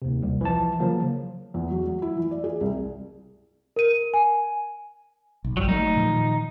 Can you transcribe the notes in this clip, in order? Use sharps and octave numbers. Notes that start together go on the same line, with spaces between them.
D#2 C3
C2
E3 F3 A5
C#3 F3 F#3 A#3
E2
F#3
F#3
E4
E3
D5
G#4
C2
A#4 D#7
G#5
B1
G1 F#3 G3
F#3 A3 D#4
A#2 D#3 F3